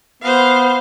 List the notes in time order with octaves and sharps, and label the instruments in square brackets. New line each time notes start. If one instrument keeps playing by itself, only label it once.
[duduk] B3 [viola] C5 F5